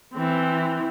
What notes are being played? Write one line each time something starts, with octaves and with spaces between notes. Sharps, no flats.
E3 C4